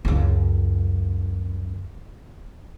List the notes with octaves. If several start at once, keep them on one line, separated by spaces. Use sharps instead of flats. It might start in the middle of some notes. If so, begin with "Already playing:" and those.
C#2 F#2